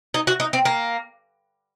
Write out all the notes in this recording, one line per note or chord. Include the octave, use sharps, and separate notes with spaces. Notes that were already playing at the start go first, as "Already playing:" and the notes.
D#4
F#4
D#4
C4
A#3